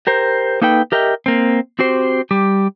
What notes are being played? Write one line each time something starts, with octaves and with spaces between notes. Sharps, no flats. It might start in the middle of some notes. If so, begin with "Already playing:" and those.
G4 A#4 C5
A#3 D#4 A4 B4 G5
G4 A#4 D#5 E5 G5
A#3 C4
C4 F#4 G4 C5
G3 G4